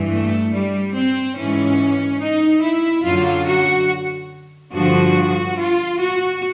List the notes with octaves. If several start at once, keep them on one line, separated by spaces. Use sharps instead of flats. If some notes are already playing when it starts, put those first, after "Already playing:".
Already playing: G2 E3
A3
G3
C4
G#2 E3 C#4
D#4
E4
F#2 D3 F#3 F4
F#4
G2 D3 F3 F#4
F4
F#4